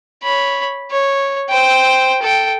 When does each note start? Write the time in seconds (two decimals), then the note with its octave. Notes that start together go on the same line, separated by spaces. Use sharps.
0.23 C#5 B5
0.91 C#5
1.49 C5 G5
2.22 A4 G5